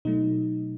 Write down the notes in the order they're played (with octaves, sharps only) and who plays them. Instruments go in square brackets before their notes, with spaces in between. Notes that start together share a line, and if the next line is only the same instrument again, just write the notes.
[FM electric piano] B2 F#3 A3 D#4